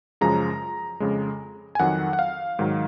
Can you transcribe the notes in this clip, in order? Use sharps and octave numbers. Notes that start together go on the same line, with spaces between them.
F#2 C#3 F3 G#3 A#5
F2 C#3 G#3
G#5
F2 D#3 F#3 F#5
F#5
F5
G#2 D#3 F#3